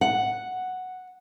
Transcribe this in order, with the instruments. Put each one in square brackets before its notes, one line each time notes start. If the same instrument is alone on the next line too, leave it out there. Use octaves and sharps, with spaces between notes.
[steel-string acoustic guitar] F#5